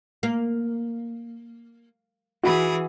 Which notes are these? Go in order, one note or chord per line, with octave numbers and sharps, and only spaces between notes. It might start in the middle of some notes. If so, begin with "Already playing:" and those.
A#3
E3 F#4 G#4 B5